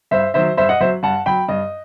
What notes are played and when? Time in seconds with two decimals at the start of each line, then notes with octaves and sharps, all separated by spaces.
0.11 G2 C5 E5
0.34 D#3 F#3 C5 E5
0.57 G2 C5 E5
0.69 D#5 F#5
0.81 F#3 C5 E5
1.03 G2 F#5 A5
1.26 F#3 G5 B5
1.48 G2 D#5